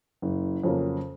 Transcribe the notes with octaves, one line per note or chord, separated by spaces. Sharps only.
F#1
F2 C#3 F#3 A#3